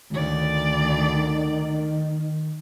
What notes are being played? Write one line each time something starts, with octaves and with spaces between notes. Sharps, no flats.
D2 D#3 D5